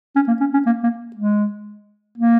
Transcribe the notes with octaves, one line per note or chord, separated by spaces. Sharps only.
C#4
A#3
C#4
C#4
A#3
A#3
G#3
A#3